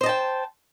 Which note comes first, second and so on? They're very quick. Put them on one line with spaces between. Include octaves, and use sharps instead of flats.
C5 D#5 A5 G5